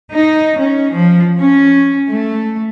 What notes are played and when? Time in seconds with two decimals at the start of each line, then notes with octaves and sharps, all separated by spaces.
0.12 D#4
0.58 C#4
0.93 F3
1.39 C#4
2.09 A3